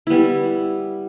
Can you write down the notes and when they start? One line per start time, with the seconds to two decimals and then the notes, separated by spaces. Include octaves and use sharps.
0.07 G3 B3 E4